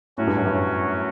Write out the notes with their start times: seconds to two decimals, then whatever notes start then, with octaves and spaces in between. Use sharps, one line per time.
0.18 A2 F#3 C#4 F#4
0.27 G2
0.37 F#2
0.45 G2